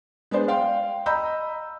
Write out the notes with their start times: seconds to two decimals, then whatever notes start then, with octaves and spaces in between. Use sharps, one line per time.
0.31 G#3 B3 D4 C5
0.48 F5 G5 C6
1.06 D#5 A#5 B5 E6 G6